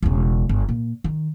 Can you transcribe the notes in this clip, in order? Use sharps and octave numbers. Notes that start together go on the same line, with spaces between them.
E1 C#3
G1
A#2
D#3